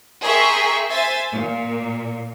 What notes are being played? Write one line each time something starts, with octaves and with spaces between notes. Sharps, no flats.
G#4 A#4 E5 G5 C6 C#6
C5 E5 G#5 A6
A#2